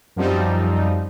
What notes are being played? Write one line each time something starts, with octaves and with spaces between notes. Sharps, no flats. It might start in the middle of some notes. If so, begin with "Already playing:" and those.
F#2 F3 G3 C4 D#4